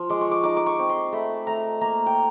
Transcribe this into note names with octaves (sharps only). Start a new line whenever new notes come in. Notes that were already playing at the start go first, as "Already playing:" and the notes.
Already playing: F3
G#3 D6
C#6
D6
D#4 D6
D6
C#6
C4
C6
A3 B5
A3 A#5
A#3 A#5
G5